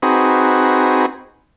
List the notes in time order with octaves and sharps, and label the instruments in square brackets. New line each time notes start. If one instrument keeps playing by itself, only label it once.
[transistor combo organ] C4 D#4 F#4 G#4 B4